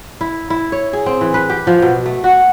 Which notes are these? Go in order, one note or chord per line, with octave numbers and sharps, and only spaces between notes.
E4
E4
C#5
G#4
C4
E3
B4
G4
F3
B2
A3
F#4